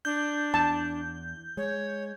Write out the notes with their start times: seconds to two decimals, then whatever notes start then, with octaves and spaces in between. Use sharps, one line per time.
0.05 D4 G6
0.54 E2 A5
1.57 G#3 C#5